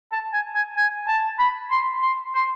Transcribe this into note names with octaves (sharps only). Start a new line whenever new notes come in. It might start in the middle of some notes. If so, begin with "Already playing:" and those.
A5
G#5
G#5
G#5
A5
B5
C6
C6
C6